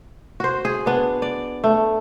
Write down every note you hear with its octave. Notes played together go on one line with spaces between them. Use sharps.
F#4 C5
G#4
B3 D4
D5
A3